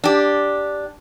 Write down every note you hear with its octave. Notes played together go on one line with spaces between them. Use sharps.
D4 G4